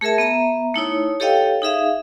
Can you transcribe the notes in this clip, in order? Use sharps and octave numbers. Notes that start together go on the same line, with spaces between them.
A3 G#4 A#4 E5 A5
B3 E5 A#5
A3 D#4 E4 C#5
G4 A4 C#5 D#5 F5 G5
D#4 G#4 E5 F5